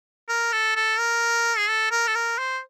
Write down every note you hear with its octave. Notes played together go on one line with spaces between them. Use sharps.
A#4
A4
A4
A#4
G#4
A4
A#4
A4
A#4
C5